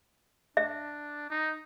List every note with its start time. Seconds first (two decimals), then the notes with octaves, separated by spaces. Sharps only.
0.57 D4 E5
1.30 D#4